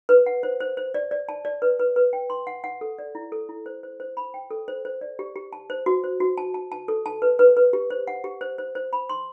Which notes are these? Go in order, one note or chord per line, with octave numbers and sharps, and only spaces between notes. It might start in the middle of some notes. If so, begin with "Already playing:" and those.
B4
F#5
C5
C5
C5
D5
D5
A5
D5
B4
B4
B4
G5
C6
F#5
F#5
A4
D5
E4
A4
E4
C5
C5
C5
B5
G5
A4
C5
C5
D5
G4
G4
A5
C5
F#4
C5
F#4
A5
A5
A5
A4
A5
B4
B4
B4
G4
C5
F#5
G4
C5
C5
C5
B5
C6